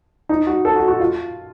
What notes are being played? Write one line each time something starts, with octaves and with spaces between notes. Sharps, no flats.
D#4
F#4
A4
F#4
F#4
F4